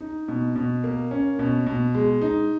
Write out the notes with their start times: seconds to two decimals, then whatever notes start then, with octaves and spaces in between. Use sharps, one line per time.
0.01 D#4
0.28 B2
0.56 B2
0.84 A#3
1.11 C#4
1.39 B2
1.66 B2
1.94 G#3
2.21 D#4